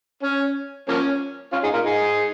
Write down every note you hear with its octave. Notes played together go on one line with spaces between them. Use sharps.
C#4
F3 A#3 C#4
C#4 F4
D#4 G#4
F4 A#4
D#4 G#4